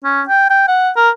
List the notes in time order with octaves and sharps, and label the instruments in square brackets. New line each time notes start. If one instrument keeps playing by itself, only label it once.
[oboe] C#4
G5
G5
F#5
A#4